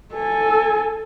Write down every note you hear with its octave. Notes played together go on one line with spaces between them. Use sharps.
A4 G#5